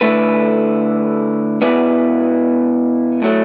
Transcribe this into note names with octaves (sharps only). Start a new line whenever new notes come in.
D3 A3 E4 B4
B2 B3 E4 B4 D5
A2 F#3 A3